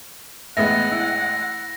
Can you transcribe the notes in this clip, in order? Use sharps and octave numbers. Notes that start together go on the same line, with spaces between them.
A1 G#3 B3 E5 F#5 A#6
E4